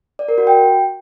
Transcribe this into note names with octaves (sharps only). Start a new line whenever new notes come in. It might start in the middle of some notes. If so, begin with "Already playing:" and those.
D5
A#4
F#4
G5